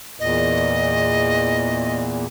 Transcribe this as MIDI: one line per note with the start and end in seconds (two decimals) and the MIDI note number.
0.20 2.26 40
0.20 2.26 46
0.20 2.02 75